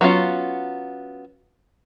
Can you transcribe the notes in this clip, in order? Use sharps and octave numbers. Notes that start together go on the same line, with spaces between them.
F#3 B3 C#4 F4